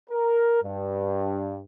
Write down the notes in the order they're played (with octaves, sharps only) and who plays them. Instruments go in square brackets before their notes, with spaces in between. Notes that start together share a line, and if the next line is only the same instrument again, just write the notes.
[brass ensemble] A#4
G2